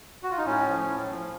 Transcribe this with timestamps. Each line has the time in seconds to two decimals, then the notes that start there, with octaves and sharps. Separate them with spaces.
0.23 F#4
0.31 F4
0.38 D#4
0.46 A2 C#4
0.67 F3
0.88 A2
1.09 F3